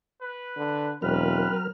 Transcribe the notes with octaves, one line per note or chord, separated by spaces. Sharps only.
B4
D3
E1 F#3 C4 A#4 B4 F6